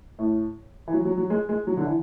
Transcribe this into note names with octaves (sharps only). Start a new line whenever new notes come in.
A2
E3
F#3
F#3
F#3
G#3
G#3
F#3
D3
E3